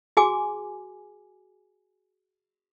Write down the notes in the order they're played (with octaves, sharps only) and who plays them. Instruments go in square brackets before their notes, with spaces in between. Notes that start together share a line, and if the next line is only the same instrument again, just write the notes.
[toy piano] F#4 G#4 G#5 D6